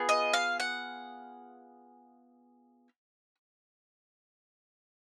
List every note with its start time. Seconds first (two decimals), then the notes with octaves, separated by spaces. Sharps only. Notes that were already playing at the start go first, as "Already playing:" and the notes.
Already playing: B3 F4 G#4
0.09 D#5
0.33 F5
0.60 F#5